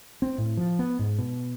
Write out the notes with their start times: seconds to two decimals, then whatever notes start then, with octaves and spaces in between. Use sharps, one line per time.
0.22 C4
0.38 A2
0.57 F3
0.79 B3
0.99 G#2
1.18 B2